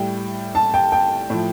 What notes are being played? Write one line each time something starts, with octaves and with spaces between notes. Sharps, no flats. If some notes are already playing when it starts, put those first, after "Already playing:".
Already playing: A2 G3 G5
A5
G5
G5
A2 F3